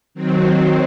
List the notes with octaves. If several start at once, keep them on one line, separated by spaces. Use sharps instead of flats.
D#3 F#3 C4